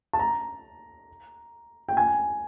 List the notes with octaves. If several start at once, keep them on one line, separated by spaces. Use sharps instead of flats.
A5
A#5
G5
G#5